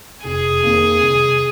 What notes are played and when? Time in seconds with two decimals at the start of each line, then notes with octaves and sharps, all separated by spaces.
0.23 F1 G#4
0.62 F2 D#3 A#3
1.02 C2